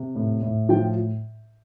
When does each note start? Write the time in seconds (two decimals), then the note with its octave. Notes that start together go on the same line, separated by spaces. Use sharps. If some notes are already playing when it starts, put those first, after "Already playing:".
Already playing: C3
0.16 A2
0.43 A2
0.69 F3 G5